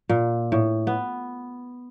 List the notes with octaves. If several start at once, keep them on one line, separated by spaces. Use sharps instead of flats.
A#2
A2
B3